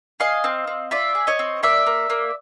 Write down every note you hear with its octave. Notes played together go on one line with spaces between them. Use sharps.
G#4 D#5 F5
C4
C4
F4 D5 E5
G#4
C#5 D#5
C4
A#3 D5 E5
A#3
A#3